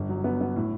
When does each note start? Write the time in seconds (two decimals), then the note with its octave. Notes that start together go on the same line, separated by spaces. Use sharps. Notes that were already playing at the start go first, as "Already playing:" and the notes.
Already playing: G1
0.09 F#3
0.24 B3
0.41 B3
0.56 A2